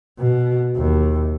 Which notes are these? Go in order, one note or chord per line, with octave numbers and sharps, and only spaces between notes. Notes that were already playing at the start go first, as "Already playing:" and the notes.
B2
D#2